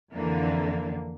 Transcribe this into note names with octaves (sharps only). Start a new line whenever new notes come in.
F2 D3 E3 A#3